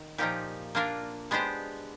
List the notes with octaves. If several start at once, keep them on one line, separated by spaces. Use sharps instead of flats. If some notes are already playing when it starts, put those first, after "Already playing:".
Already playing: D#3
A#2 F3 A#3 D#4 G4
A#3 D4 F4 A#4
G#3 B3 D4 G4 C5